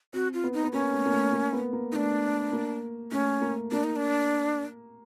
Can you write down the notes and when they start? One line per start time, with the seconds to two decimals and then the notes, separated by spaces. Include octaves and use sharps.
0.13 C4 F#4
0.34 F4
0.44 B3
0.54 D#4
0.63 B3
0.73 A#3 C#4
0.93 A3
1.06 A#3
1.13 A3
1.33 A#3
1.53 B3
1.73 A#3
1.92 A3 D4 D#4
2.53 A#3
3.11 A3 C#4
3.42 A#3
3.71 A#3 D4
3.84 D#4
3.96 D4